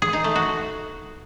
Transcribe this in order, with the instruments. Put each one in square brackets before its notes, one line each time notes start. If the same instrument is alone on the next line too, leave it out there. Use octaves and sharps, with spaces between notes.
[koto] G#4
D#4
A3
F#4